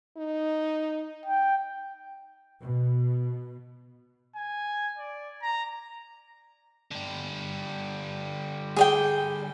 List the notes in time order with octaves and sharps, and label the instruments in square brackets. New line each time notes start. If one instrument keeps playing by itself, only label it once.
[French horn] D#4
[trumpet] G5
[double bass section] B2
[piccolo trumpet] G#5
D5
A#5
[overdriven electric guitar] D3 G3
[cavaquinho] G#4 D5 G5